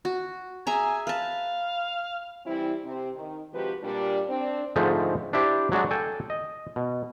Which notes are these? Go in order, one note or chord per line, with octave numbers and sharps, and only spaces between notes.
F#4
G#4 E5 G#5 A#5
B4 F5 A5
E3 G3 C4 E4
C3 C4
D#3
C3 F3 G#3 F#4 G4 B4
A#2 G3 D4
C4 D4
G#2 D3 F3 G#3 A3 C4
D4 E4 G4 C5 D5
F#3 G#3 D4 F#4
A4 G5 G#5
D#5
B2